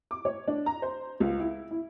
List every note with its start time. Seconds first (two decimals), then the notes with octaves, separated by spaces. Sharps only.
0.11 D6
0.25 C#5
0.48 D4
0.66 A#5
0.82 C5
1.20 C#2
1.39 E4
1.71 E4